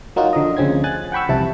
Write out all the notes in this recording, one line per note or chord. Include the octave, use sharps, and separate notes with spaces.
F#3 A#3 D#4 F4 F#4
D3 F3 D#5
D2 C#3 F3 C4 C#4 G#6
G#5 F#6 A6
F#5 G5 B5 C#6 E6
C2 F2 C3 E3 E4 A5